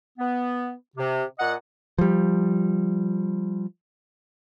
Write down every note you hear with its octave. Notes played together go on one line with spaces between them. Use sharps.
B3
C3
A#2 D#5 F#5
F3 G3